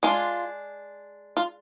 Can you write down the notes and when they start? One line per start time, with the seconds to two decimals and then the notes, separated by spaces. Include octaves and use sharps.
0.03 G#3 D4 F4
1.37 F4